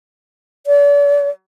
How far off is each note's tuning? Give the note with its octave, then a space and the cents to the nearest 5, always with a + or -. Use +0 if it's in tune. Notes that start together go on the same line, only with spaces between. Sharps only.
D5 -40